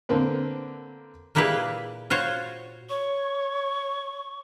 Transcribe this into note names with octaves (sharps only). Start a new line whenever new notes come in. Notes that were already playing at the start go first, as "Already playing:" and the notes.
D3 A#3 C4 B4
A#2 A#3 E4 G4 G#4 B4
F4 F#4 C5 C#5
C#5 C#6